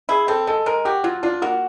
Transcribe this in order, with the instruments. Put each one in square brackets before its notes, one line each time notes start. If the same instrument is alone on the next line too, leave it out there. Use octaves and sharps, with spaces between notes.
[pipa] E4 [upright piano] G#4
[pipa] C4 [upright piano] A4
[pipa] G#3 [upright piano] A4
[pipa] G#3 [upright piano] A#4
[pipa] F#4 [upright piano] G4
[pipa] F#3 [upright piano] F4
[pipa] D4 [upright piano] F4
[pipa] A#3 [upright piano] F#4